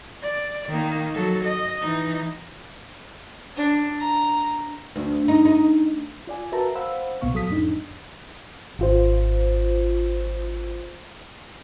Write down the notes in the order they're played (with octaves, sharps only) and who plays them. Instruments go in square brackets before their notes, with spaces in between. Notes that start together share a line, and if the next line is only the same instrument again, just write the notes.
[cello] D5
D#3 A#3
F#3 A4
D#5
E3 D#4
[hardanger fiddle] D4
A#5
[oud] D2
D#4
D#4
[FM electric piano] F4 D5 G#5
F#4 A#4 B4 E5 A5 A#5
C5 F5 F#5 B5 E6
C2 A#2 B3 F5 C#6
F#3 A4 D#6 B6
F2 A2 D4 D#4
G#1 F4 C5